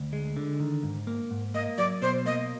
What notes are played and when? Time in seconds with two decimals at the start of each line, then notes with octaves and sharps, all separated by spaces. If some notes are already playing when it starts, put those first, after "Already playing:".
Already playing: D2
0.13 G#3
0.37 D3
0.60 D#3
0.83 G#2
1.07 A#3
1.31 G#2
1.54 A#3 D#5
1.78 F#3 D5
2.02 B2 C5
2.25 A#3 D#5